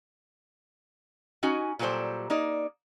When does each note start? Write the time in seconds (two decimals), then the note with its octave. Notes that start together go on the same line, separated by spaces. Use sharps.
1.43 C#4 D#4 F#4 G#5
1.79 A#2 F#3 G3 A4 C5 D5
2.30 A#3 D#4 D5